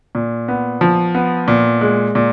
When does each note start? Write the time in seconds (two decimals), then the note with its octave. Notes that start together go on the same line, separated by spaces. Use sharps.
0.15 A#2
0.48 B3
0.81 F3
1.15 B3
1.48 A#2
1.81 G#3
2.15 A#2